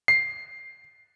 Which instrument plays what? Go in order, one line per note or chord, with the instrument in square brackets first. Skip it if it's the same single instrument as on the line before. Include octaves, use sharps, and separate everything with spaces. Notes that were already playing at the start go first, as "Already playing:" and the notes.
[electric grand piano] C7